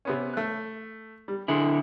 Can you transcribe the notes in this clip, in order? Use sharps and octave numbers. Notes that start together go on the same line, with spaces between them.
C3 B3 C#4
A3 F#6
G3
D3 E4 G#4 C6